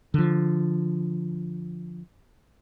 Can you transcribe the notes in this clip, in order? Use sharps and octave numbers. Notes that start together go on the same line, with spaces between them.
D3 F3